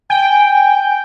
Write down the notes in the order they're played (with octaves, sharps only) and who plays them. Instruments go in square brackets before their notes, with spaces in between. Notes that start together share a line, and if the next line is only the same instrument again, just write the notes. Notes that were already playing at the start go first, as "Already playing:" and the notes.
[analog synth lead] G5 [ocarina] G#5